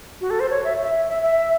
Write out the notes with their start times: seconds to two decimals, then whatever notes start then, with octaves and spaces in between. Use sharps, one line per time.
0.21 F#4
0.30 A4
0.40 C5
0.50 C#5
0.64 E5
0.83 E5
1.09 E5
1.23 E5